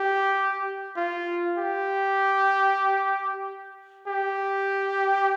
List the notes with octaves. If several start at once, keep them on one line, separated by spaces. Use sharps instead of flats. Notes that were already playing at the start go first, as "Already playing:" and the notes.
Already playing: G4
F4
G4
G4